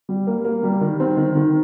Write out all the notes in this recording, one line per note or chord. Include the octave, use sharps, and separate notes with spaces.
G3
A#3
A#3
G3
D#3
C4
D#3
D#3